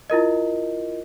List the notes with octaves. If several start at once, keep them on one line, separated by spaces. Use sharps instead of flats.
E4 F4 A#4 D#5